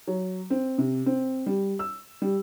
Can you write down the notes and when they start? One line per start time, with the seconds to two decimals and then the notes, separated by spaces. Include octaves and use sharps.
0.07 F#3
0.50 C4
0.78 C3
1.06 C4
1.46 G3
1.79 E6
2.22 G3